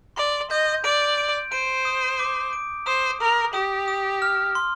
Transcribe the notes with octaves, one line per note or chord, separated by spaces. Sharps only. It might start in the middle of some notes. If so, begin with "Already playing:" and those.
D5 C6
D#5 G6
D5 D7
D7
C5 D7
D#6
D6
D7
C5 D#6
A#4 D#6
G4 D#6
D#6
F6
C6